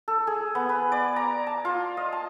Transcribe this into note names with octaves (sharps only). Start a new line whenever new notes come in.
A4
G#4
B3
B4
D5
A#5
A5
F4
D#5
A5